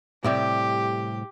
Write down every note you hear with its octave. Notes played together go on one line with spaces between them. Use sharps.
A2 C3 G3 G4